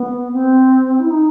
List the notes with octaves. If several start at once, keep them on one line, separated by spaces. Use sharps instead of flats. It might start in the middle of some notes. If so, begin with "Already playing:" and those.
Already playing: B3
C4
E4
D#4